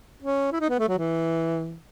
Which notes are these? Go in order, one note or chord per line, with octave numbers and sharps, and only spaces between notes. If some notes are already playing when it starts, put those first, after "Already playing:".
C#4
E4
D#4
B3
A3
F#3
E3